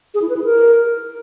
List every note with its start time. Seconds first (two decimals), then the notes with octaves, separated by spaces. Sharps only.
0.14 G#4
0.22 E4
0.29 B4
0.37 E4
0.44 A#4